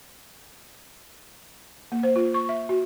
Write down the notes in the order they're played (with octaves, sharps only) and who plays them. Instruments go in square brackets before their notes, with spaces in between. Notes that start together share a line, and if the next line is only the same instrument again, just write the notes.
[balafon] A#3
C5
F4
C#6
E5
F#4